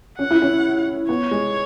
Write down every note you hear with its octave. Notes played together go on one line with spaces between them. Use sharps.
C#4 F#5
E4
C#4
B3 C#5
G#3